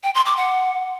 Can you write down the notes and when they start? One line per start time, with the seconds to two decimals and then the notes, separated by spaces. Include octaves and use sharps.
0.03 G5
0.15 C6
0.26 D6
0.37 F#5